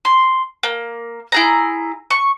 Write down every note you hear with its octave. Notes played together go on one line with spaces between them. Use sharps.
C6
A#3
E4 G#4 A#5
C#6